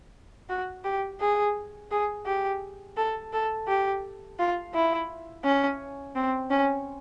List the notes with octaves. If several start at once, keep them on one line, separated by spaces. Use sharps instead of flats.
F#4
G4
G#4
G#4
G4
A4
A4
G4
F4
E4
C#4
C4
C#4